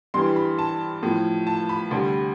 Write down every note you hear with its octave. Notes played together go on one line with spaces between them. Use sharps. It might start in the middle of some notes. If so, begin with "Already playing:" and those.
G2 E3 G3 C6
B5
A5
A2 F3
A5
B5
D2 C3 G3